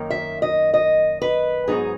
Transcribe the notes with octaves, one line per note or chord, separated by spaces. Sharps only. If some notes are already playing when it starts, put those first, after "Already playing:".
Already playing: F#2 D#3 A#3 D#4
E5
D#5
D#5
B4
G#2 F#3 B3 D#4 G#4